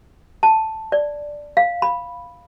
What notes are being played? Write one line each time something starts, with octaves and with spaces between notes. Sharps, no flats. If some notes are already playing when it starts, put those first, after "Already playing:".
A5
D5
F5
B5